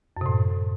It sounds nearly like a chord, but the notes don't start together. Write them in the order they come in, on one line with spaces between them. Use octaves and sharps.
F#2 C3 A2